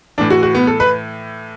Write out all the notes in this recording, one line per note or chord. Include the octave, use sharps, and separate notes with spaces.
A2 E3 D4
F#4
F#4
B3
A4
B4